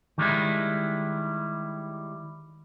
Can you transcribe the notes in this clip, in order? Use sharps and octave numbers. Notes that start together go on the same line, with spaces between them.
D#3 G3 G#3 E4